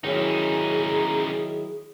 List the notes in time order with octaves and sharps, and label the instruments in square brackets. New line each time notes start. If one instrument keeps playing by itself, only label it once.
[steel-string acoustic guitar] D#3 F#3 E4 [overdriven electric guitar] C#4 D#4 [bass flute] G#4